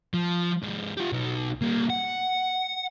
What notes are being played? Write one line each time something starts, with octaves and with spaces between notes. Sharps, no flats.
F3
G#2 B4
F4 G4
B1 D#4
G3 A#3
F#5